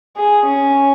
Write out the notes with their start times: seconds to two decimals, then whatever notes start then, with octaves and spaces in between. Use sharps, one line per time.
0.17 G#4
0.45 C#4